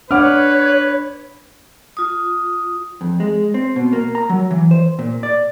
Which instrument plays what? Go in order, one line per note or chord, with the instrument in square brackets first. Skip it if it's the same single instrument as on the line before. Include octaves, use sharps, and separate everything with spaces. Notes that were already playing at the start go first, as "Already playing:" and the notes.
[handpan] D4 [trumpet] B4 [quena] C#5 [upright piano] F#5 D6 F6
[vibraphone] F4 D#6
[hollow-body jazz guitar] F2
G#3
C4
B2
A#3
A#5
F#3
E3
C5
A#2
D5